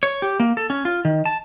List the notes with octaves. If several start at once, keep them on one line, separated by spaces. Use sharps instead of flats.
C#5
G4
A#3
A4
C#4
F4
D#3
A5